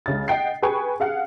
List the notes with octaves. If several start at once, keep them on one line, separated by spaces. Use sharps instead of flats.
C#2 C#3 A6
D#5 F#5 G5 C7
G#4 B4 G5 G#5 C#6
G#4 F5 F#5